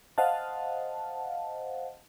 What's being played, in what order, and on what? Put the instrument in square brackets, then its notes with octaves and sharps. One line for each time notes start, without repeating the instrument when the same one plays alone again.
[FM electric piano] C5 D#5 F5 F#5 A5